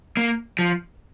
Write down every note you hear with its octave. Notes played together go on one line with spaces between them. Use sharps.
A#3
F3